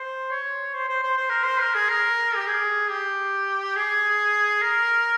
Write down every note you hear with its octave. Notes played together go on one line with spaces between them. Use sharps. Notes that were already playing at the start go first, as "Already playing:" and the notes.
Already playing: C5
C#5
C5
C5
C5
C5
A#4
C5
A#4
G#4
A#4
G4
G#4
G4
G#4
A#4